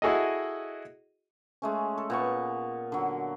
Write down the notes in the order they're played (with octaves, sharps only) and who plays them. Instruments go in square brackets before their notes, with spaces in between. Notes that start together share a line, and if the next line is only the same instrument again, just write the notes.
[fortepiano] E4 F#4 G#4 A4 D#5
[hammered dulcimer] G#3 A3 C#4
A4
A#2 B3 C#6
D3 F#3